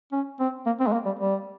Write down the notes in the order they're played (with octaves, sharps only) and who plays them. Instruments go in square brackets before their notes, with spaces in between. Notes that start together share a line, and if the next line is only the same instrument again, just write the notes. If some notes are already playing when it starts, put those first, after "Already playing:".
[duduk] C#4
C4
A#3
C4
G#3
A#3
G3
G3